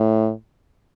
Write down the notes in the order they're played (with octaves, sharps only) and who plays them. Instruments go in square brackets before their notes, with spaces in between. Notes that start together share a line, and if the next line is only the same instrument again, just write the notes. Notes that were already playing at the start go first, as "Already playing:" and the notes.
Already playing: [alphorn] A2